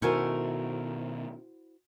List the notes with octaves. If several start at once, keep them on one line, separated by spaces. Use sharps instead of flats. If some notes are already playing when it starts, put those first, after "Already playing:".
B2 D#3 A3 E4 F#4 A#4 C5 G#5